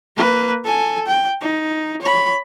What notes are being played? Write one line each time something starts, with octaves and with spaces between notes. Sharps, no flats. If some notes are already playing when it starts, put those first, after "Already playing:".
A#3 B4
A4 G#5
G5
D#4
C#5 B5